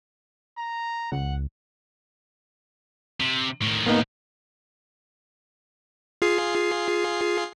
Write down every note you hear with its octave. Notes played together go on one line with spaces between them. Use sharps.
A#5
C#2 F#5
C3
A2 D#3
A#3 B3 D#4
F4 G#4 C7